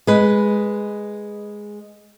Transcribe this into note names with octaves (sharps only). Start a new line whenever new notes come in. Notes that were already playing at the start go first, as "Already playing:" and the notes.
G#3 B4